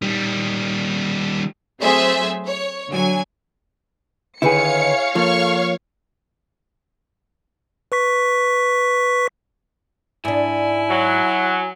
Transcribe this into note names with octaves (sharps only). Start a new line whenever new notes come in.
D#3 G3
F#3 A3 C4 G#4 C5 E5
C#5
D3 F#3 G#5
D3 D#3 E4 G#4 B4 C#5 F5 C#7
F3 A#3 A4 C#6 F6
B4 C#6 B6
G#2 D4 E4 G#5
F#3